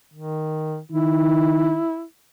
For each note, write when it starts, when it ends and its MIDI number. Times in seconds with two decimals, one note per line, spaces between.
0.14 0.79 51
0.92 1.78 51
0.92 2.03 64